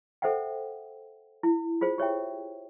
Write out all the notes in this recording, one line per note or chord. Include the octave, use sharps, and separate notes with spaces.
A4 C5 E5 F#5 G5
E4
F4 G#4 C5
G4 C#5 E5 G5